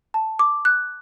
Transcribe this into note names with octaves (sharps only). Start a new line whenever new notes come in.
A5
D6
F#6